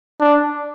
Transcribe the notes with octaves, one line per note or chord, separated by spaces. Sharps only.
D4